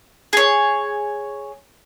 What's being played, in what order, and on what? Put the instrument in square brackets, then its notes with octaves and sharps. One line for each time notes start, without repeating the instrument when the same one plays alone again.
[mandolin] G#4 C#5